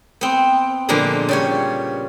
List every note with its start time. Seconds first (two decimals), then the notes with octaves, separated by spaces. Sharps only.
0.21 B3 C4
0.89 A#2 D3 F3 G#3 A#3 B3
1.29 C#3 G3 C#5